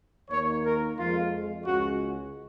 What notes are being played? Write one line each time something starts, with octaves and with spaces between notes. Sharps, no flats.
D#2 D#3 A#3 C#5
A#4
F2 F3 G#3 F4
C#2 C#3 G#3 C#4 F#4